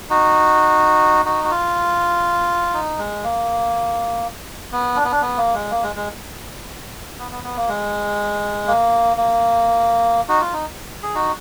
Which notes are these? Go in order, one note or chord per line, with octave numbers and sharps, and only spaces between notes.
D#4 F#4
D#4 F#4
F#4
F4
D#4
G#3
A#3
B3
D4
B3
D4
B3
A#3
G#3
A#3
G#3
G#3
B3
B3
B3
A#3
G#3
A#3
A#3
D#4 F#4
F4
D#4
G#4
D#4 F#4